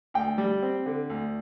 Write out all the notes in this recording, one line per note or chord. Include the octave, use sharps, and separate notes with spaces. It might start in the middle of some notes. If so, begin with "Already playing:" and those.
D2 G5
G3
C4
D3
D2